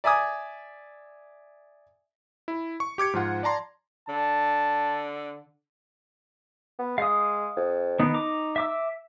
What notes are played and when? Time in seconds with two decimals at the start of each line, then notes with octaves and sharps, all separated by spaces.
0.04 D5 E5 G#5 D6 D#6
2.48 E4
2.80 C#6
2.98 G4 D6 G#6 C#7
3.13 G#2 F3 F4 F#5
3.43 D5 A5 A#5 C6
4.09 D3 A5
6.79 B3
6.98 G#3 F5 D#6
7.56 F2
8.00 D#3 B3 D#4
8.14 A#5 D6
8.56 E5 D6 E6